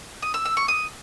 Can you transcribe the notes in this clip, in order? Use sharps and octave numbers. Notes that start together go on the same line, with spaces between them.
D#6
E6
E6
C#6
D#6